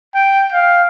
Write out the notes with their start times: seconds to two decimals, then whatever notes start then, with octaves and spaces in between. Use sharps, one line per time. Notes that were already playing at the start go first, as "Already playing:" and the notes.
0.15 G5
0.52 F5